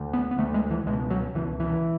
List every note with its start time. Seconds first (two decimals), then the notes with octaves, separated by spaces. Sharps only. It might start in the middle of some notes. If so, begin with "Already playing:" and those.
Already playing: D2 D3
0.13 B3
0.31 B3
0.38 D2 D3 A3
0.54 G#3
0.70 E3
0.86 C#2 B2 G#3
1.10 F#3
1.35 C#2 B2 E3
1.60 E3